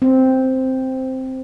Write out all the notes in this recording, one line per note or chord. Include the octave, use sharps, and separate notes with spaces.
C4